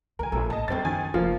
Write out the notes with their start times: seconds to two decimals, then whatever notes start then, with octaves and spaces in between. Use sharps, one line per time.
0.19 C#2 F3 A#4 G#5
0.32 A#1 A4
0.50 A1 D#5 A5
0.68 G1 F#2 C4 C#4 A6
0.85 D#3 G#5
1.14 F1 F3 A#3 F4